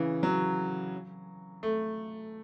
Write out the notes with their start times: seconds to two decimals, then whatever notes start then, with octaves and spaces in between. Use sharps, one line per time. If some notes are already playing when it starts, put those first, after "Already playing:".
Already playing: C#3 E3
0.23 F#3
1.63 A3